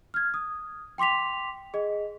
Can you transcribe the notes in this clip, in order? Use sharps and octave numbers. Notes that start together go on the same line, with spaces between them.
F6 G#6
D#6
G5 C6 D6 B6 F7
G#4 D#5